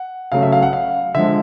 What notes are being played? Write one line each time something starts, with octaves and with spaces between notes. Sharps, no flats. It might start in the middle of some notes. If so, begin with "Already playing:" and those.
Already playing: F#5
C#3 F#3 A3 F5
E5
F5
F#5
F5
D3 F3 G#3 E5